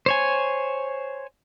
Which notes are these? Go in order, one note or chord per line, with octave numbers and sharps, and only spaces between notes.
C5 C#5 G#5